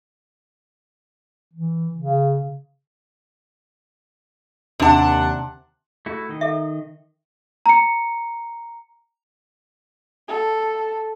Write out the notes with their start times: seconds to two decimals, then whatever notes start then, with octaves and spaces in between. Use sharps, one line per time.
1.53 E3
1.94 C#3
4.80 D#2 C3 D4 F#5 A5
6.06 A3 E4 F#4
6.29 D#3 D#5
6.41 A4 E5
7.66 A#5 C#7
10.28 A4